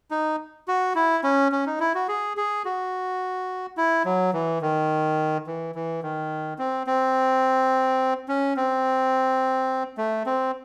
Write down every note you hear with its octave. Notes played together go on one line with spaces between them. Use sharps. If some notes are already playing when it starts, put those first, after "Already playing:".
D#4
F#4
E4
C#4
C#4
D#4
E4
F#4
G#4
G#4
F#4
E4
F#3
E3
D#3
E3
E3
D#3
C4
C4
C#4
C4
A3
C4